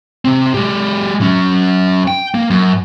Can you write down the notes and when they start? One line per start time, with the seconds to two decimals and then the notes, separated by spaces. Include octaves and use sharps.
0.25 C3 C4
0.54 G#3 G4
1.21 F#3 C#4
2.08 G5
2.35 A#3
2.50 F#2